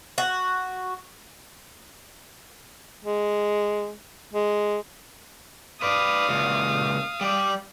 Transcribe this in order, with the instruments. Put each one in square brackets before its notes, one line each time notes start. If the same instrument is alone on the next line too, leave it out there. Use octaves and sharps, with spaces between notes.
[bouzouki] F#4
[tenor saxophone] G#3
G#3
[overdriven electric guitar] B4 D5 [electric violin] F5 D#6
[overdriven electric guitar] C#2 A#2
G3 D5